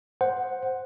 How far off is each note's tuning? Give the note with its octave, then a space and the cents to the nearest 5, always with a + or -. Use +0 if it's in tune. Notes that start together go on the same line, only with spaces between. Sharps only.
C5 +0 F#5 +0